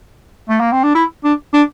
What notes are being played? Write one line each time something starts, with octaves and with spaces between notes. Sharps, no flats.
A3
A#3
C4
D4
E4
D4
D4